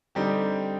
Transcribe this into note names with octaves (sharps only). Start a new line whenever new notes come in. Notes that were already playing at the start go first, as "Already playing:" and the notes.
D3 G3 C4 D#4 G4